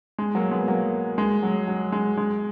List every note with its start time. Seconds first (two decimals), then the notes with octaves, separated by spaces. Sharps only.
0.18 G#3
0.35 F#3 A#3
0.52 G#3 B3
0.68 F#3 A#3
1.18 G#3
1.43 F#3
1.68 F#3
1.92 G#3
2.17 G#3